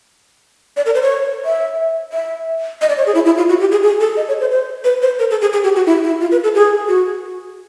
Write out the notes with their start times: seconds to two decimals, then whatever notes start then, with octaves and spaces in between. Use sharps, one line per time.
0.77 D5
0.86 A#4
0.94 C5
1.02 C#5
1.45 E5
2.13 E5
2.81 D#5
2.89 D5
2.97 C#5
3.06 G#4
3.15 E4
3.26 E4
3.37 F4
3.49 F#4
3.60 G4
3.72 G#4
3.83 G#4
4.00 A4
4.17 D#5
4.28 C#5
4.40 C5
4.51 C5
4.84 B4
5.02 C5
5.19 A#4
5.30 A4
5.42 G#4
5.53 G#4
5.64 G4
5.76 F#4
5.86 E4
6.04 E4
6.21 F4
6.32 B4
6.44 A4
6.55 G#4
6.88 F#4